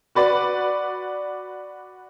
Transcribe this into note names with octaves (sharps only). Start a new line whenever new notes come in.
F#4 B4 D5